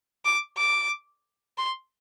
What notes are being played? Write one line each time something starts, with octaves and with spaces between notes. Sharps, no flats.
D6
D6
C6